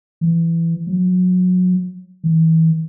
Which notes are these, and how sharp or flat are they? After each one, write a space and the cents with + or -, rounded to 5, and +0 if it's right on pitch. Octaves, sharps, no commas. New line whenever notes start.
E3 +15
F#3 -25
E3 -30